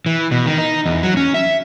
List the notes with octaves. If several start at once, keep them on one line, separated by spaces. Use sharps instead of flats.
E3
B2
D#3
D#4
E2
F#3
C#4
E5